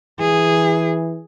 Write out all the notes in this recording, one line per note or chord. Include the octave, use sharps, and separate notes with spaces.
E3 G#4